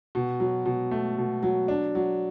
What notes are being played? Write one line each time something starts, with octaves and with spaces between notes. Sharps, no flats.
B2
F#3
B2
A3
B2
F#3
D4
F#3